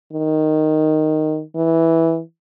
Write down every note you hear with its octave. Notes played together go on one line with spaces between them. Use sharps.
D#3
E3